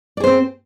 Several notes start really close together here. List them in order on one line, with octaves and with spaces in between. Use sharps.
D5 G#4 C5 C4